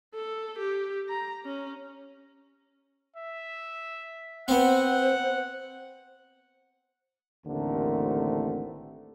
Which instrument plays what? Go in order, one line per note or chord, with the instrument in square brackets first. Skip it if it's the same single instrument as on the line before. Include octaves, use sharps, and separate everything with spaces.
[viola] A4
G4
A#5
C#4
[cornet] E5
[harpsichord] B3 C4 [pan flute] C5 [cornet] F#5
[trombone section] A1 D#2 D3 A3 C4 A#4